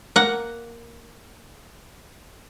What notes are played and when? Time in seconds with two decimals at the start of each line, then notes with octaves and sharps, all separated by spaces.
0.16 A#3 F#5